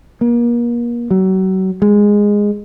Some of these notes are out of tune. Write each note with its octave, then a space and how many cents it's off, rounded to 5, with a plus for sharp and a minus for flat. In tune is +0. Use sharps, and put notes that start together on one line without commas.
A#3 +35
F#3 +35
G#3 -10